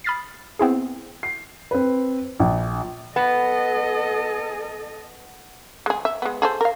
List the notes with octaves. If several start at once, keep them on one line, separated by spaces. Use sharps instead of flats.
B5 D#6 F6 A6 B6 C7
B3 C4 E4 G#4
C7
C4 B4
A#1
B3 A4 D#5
G#3 G#4
E5
G#3 B3
G#4 A4 C5
A#4 F5